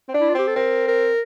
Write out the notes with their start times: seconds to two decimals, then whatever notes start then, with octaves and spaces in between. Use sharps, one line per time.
0.08 C4
0.14 D4
0.20 E4
0.29 F4
0.34 C4 G4
0.47 A4
0.55 C4 A#4
0.88 A#4